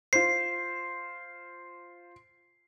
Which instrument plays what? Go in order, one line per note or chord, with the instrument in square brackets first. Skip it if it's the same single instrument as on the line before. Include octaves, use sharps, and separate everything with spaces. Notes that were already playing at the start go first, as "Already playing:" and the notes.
[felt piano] F4 C5 [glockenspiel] C7